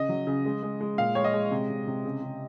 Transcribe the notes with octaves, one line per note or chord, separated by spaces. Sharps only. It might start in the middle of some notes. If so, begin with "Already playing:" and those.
Already playing: C#3 D#5
F#3
C#3
G#3
G#3
G#3
A#2 F5
G#3 C#5
D#5
G#3
C3
C3
C3
C#3
C#3